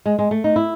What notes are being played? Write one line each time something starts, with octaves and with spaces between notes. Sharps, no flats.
G#3
G#3
A3
D#4
E4